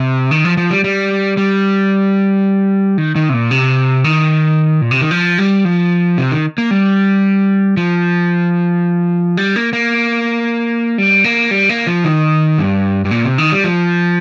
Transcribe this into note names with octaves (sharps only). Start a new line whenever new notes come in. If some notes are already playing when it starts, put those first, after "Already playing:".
Already playing: C3
D#3
F3
F3
G3
G3
G3
D#3
D#3
C3
A#2
C3
D#3
A#2
C3
D#3
F3
G3
F3
C3
D#3
A#3
G3
F3
G3
A#3
A#3
G3
A#3
G3
A#3
F3
D#3
G2
G2
A#2
C3
D#3
G3
F3